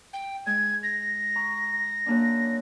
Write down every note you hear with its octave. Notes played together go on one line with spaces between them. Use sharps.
G5
G#3 G#6
A#6
A#5 C#6
F#2 A#3 D4